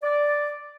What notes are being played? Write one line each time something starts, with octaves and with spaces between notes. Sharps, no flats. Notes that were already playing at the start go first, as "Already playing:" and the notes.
D5